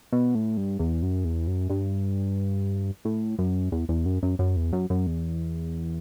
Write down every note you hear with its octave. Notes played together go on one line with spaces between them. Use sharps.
B2
A2
G2
E2
F#2
E2
F#2
G2
A2
F#2
E2
E2
F#2
F#2
F#2
E2
F#2
F#2
E2